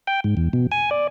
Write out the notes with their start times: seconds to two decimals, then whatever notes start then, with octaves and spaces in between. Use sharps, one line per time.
0.07 G5
0.24 G#2
0.37 E2
0.53 B2
0.72 G#5
0.91 D5